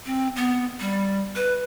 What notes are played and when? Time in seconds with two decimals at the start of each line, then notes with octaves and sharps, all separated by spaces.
0.06 C4
0.36 B3
0.80 G3
1.36 B4